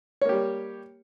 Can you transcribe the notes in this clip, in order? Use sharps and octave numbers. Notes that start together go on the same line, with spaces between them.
G3 A#3 G4 C#5